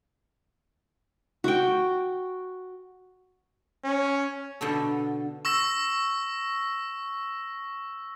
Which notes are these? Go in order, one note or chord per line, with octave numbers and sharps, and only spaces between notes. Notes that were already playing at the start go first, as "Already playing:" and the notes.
F#4 G5
C#4
B2 D3 A4
C#6 E6 A#6